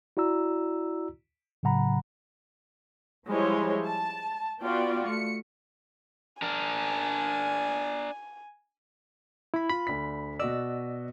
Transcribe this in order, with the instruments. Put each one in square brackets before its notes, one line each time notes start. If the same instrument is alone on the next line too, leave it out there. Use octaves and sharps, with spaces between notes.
[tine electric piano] E4 F#4 D5 A#5 E6
A2 C#3 F#3 F#5 A#5 B5
[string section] F3 G3 G#3 E4 C5 C#5
A5
B3 F4 F#4 D5 G5
A3 C#7
[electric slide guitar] D4 A#4 [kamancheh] G#5
[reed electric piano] E4 B5
[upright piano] F4 [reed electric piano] B5
[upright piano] D2 D4 B6
[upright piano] B2 F#4 D#5 [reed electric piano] D5 E6